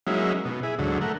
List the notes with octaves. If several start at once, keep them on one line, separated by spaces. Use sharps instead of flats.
F#3 G#3 A#3 C#4 D#4 E4
B2
E4 G#4
D2 G#2 D3 F#3
A3 A#4 F#5